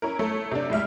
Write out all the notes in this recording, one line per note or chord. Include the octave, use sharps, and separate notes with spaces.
C#4 E4 A#4
A3 A4 C#5
C3 D4
A2 G#3 E5 F6